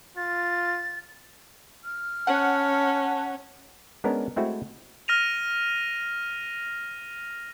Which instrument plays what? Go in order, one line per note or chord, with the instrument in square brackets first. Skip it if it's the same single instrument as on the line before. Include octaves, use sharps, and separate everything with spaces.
[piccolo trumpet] F4 [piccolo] A6
[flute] F6
[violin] C#4 [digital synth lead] F#5 [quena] A5
[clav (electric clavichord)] G#3 B3 C#4 D4 A#4
G#3 A3 C4 E4 F#4
[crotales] F6 A#6 D#7 F7